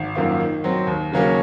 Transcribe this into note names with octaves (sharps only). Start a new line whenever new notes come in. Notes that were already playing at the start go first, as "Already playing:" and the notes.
Already playing: G#1
F#2 D#3 A#3 F4
D#3
F#3 C4
D#2
C#3 F#3 A#3 C#4